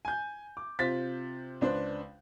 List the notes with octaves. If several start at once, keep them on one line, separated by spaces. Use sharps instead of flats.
G#5 G6
D6
C3 F4 C5 A6 B6
C#2 D4 B4 C5